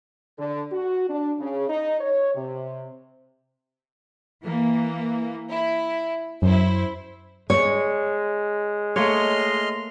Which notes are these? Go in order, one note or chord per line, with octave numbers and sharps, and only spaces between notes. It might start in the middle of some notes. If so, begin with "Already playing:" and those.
D3
F#4
D4
C#3
D#4
C#5
C3
E3 A#3
E4
F#2 E4 C5
G#3 C#5
A3 A#3 C#5 D#5 C6 F6